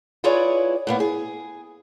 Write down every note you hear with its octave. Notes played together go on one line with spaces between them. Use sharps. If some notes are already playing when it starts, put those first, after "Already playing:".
E4 F4 G#4 B4 C#5 D5
A2 A#3 B3
G#4